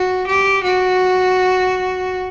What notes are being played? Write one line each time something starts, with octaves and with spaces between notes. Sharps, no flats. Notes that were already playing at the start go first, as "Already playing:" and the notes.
Already playing: F#4
G4
F#4